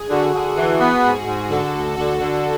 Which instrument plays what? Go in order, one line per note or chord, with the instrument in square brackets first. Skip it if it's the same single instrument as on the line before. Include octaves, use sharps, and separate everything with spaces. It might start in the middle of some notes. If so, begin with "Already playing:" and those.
Already playing: [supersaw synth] G#4
[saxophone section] D3 [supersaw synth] F#4
[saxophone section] D3
[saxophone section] E3 [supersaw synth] F#4
[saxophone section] B3
[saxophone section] G#2 [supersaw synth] G#4
[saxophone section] G#2
[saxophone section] D3 [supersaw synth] F#4 A4
[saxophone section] D2
[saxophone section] D3 [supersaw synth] F#4 A4
[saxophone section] D3